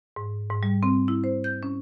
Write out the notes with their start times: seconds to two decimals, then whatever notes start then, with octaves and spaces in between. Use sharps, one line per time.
0.16 G#2
0.50 G#2
0.63 G3
0.83 C4
1.08 E4
1.24 C5
1.44 G6
1.63 C#4